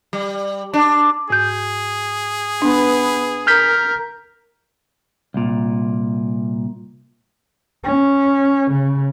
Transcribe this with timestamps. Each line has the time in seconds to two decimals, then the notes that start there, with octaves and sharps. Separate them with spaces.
0.13 G3
0.74 D4
1.30 G#2 G#4 G6
2.62 B3 D4 B4
3.47 A#4 F6 G6 B6
5.34 C2 A#2
7.84 C#4
8.71 C#3